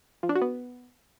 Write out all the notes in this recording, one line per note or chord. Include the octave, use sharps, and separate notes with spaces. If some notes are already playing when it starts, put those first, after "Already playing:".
F3
D4
F#4
B3